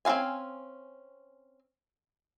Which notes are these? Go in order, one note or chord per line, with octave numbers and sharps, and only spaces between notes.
C4 C#4 F#4 F5 G#5